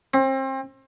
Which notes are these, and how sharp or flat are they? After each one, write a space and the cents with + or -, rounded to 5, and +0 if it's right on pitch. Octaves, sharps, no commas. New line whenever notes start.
C4 +35